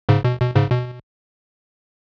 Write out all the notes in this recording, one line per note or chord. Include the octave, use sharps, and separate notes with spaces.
G#2 C#3
B2
B2
G#2 C#3
B2